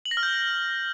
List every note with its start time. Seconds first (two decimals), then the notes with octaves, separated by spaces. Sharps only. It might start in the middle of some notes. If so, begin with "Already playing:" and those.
0.05 F#7
0.11 A#6
0.17 F6
0.23 G6